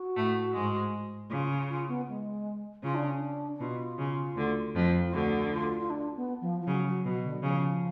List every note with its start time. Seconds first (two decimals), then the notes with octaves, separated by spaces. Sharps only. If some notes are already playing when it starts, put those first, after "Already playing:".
Already playing: F#4
0.16 A2 A3
0.54 G#2 G#3
1.30 C#3 F4
1.69 F4
1.88 B3
2.08 G#3
2.83 C#3 F4
2.95 D4
3.06 C#4
3.18 D4
3.55 D4
3.60 B2 F4
3.99 C#3
4.36 D2 D3
4.76 F2 F3
5.06 F4
5.13 D2 D3 F#4
5.47 D4
5.52 F4
5.79 F4
5.90 D4
6.16 B3
6.41 F3
6.61 F3
6.67 C#3 F#3
6.86 F#3
7.04 B2 F#3
7.24 D3
7.43 C#3 F3